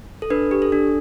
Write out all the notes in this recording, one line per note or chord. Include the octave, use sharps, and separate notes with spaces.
A4
D4 B4
G4
A4
D4